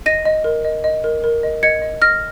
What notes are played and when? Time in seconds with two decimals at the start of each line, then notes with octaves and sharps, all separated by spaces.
0.06 D#5 A#6 D#7
0.25 D#5
0.44 A#4
0.65 D#5
0.84 D#5
1.04 A#4
1.24 A#4
1.43 D#5
1.63 D#5 G#6 C#7
1.82 D#5
2.02 D#5 F6 A#6